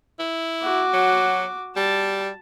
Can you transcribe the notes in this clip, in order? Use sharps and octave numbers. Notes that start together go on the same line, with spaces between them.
E4
F#4 D6
F#3
G3 A5